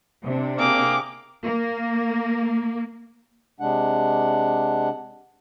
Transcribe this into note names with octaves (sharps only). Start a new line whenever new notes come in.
C3 D4
A#3 G4 G#4 D6
A#3
C3 G#3 D4 F#5